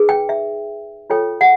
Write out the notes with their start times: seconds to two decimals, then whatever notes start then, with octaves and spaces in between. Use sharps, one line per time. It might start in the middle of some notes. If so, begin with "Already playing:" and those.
Already playing: D#4 G#4 B4
0.09 G5
0.29 E5
1.10 F4 A4 C#5 G5
1.41 F#5